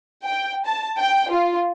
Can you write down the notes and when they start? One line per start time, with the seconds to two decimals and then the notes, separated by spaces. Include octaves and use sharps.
0.25 G5
0.66 A5
0.98 G5
1.32 F4